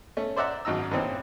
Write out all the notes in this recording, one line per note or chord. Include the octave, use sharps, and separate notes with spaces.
A3 C#4
C5 D5 E5 F#5 A#5
G#1 F#2 D#4 A#5 E6
G2 A#2 E3 C4 C#4 D#4